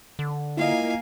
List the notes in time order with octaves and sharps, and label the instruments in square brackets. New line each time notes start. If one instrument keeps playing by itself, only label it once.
[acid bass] D3
[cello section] A#3 [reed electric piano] E4 F4 D#5 [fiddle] F5 G#5